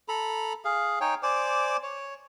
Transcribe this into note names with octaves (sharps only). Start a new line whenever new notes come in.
A4 A#5 B5
G#4 F5
D#4 C#5 G5 G#5
C5 D5 G#5 D6
C#5